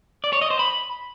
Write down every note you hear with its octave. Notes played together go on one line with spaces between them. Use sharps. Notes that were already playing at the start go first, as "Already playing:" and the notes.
D5
C#5
D#5
C5
B5